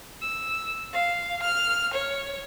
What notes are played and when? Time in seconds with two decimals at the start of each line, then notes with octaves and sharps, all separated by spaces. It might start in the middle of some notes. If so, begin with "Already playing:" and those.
0.21 E6
0.93 F5
1.43 F6
1.94 C#5